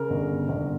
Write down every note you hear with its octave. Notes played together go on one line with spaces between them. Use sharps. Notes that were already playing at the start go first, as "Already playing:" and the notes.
Already playing: C#3 A#4
G1
G1